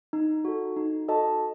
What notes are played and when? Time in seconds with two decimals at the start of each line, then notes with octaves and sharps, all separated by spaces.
0.13 D#4
0.45 F#4 A4
0.76 D#4
1.09 F#4 A4 D#5 A5